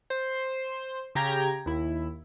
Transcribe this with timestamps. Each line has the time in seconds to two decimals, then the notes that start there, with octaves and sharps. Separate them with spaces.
0.10 C5
1.15 C#3 G4 G5 A#5 G#6 A#6
1.66 D#2 E4